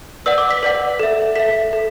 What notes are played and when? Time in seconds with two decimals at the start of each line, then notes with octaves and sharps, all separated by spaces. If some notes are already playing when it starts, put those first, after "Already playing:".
0.26 B4 D5 F#5 E6
0.38 D6
0.51 B6
0.63 B4 D5 F#5
0.99 A4 E5
1.35 A4 E5 B6
1.73 A4